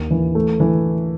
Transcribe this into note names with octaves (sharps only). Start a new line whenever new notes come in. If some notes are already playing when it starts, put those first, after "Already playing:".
Already playing: D#2
E3
A3
E3